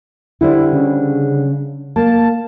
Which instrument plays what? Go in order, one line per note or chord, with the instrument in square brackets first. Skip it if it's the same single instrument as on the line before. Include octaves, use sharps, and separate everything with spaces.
[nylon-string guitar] D3 G3 C5 [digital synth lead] E4
[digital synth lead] C#3
[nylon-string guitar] A#3 [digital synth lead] A5